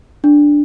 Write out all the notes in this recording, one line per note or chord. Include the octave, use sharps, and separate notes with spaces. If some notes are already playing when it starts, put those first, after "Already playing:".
D4